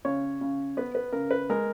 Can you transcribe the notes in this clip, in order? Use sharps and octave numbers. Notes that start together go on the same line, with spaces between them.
C#3 C#5
C#3
B3 B4
B4
C#3 A#4
B4
G#3 A#4